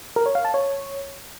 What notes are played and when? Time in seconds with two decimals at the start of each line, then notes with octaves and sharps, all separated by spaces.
0.16 A#4
0.26 C#5
0.35 F5
0.45 A5
0.54 C#5